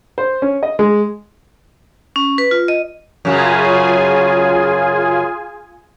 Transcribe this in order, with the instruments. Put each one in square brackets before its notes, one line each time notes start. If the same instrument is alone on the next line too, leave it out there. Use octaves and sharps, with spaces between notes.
[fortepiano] C5
C#4
D#5
G#3
[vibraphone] C#4
B4
F4
D#5
[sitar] F#2 C#3 F#3 [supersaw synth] F4 G#4 G#5